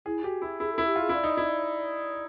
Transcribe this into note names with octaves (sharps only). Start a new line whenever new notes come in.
E4 G#4
F#4 G4
E4
E4 G#4
A4
E4
G4
F4
G#4
E4 D5
D#4
E4